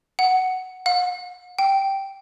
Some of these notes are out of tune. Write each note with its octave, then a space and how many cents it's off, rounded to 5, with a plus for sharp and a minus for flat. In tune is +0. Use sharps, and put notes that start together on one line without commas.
F#5 +5
F#5 -45
G5 -5